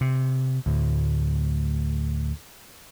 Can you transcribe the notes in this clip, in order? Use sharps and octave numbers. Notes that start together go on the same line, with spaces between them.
C3
D2 A2